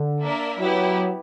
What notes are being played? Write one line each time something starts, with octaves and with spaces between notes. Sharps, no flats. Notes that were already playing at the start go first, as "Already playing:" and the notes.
Already playing: D3
A#3 D4 A#4 E5
F#3 B3 E4 G4